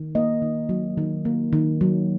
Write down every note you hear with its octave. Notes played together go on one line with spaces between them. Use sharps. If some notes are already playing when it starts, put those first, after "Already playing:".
Already playing: D#3
A#3 D#5
D#3
F#3
D#3
A#3
D#3
F#3